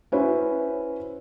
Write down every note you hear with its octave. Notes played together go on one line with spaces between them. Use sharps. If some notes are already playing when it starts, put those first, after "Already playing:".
C#4 E4 F#4 B4 C5